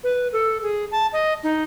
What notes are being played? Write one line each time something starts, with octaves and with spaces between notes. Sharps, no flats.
B4
A4
G#4
A5
D#5
D#4